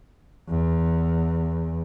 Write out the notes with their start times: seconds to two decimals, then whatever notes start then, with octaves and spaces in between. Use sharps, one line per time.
0.49 E2